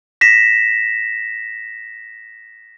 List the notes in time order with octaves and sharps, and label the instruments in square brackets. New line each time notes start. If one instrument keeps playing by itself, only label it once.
[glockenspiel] A#6 B6 E7